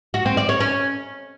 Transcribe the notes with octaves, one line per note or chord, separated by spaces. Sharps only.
F#4
C4
D5
C#5
C#4